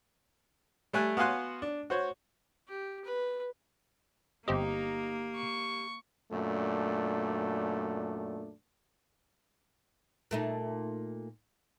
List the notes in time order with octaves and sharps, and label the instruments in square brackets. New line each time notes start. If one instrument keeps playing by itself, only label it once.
[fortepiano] G3 A3 G#5 F#6
B3 F#4 F5 G#5 C6 F#6
D4
F#4 C5 C#5
[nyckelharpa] G4
B4
[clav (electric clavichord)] G1 C4 D#5 [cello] A#3 [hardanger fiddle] D#4 [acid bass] G4
[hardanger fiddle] C#6
[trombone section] F#2 A#2 A3 D4
[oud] A#2 A3 D#4